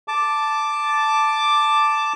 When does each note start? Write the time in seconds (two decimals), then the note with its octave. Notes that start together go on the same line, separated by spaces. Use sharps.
0.08 A5 D6